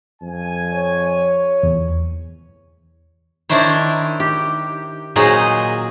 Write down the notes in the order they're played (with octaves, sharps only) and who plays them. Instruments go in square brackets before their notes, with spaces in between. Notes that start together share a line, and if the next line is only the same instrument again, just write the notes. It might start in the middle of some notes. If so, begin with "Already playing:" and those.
[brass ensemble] F2 G#5
[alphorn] C#5
[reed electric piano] E2
[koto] D#3 D4 E4 C5 C#5
G4
A#2 F#3 D#4 G#4 C5